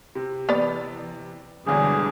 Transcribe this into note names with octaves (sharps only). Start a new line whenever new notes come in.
C3
E3 B3 D5
G1 E2 B2 D3 G3 G#3 G#4